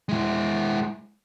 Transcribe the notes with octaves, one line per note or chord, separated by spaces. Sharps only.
G#3 E4